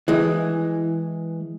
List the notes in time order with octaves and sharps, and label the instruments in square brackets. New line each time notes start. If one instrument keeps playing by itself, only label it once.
[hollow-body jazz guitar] E3 G#3